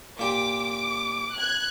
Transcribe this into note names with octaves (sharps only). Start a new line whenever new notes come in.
A#2 G4 D6
F#6 G#6